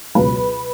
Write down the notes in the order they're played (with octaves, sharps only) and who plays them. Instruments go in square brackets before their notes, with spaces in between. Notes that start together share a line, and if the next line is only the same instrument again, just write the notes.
[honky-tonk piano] C#2 B2 F#3 B4